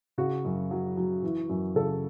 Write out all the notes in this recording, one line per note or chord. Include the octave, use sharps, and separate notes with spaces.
C#3 F#4
F#2
F#3
F#3
E3
F#2
C#3 A4